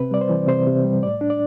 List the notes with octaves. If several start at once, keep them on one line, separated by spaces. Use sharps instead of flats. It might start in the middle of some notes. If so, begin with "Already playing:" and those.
Already playing: C3 C4 B4
G3 D5
C5
E3
C3 C5
C3
G3
A2 D5
D4
D5